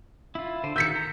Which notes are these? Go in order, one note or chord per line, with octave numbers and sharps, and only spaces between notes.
E4 F4
D3 C5
D#3 F#4 E6 G6 B6 C#7
A#5